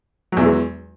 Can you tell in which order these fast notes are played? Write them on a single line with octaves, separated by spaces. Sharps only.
F#3 E2 E3 G#3